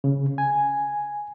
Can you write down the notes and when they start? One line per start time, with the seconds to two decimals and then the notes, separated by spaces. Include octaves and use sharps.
0.04 C#3
0.38 G#5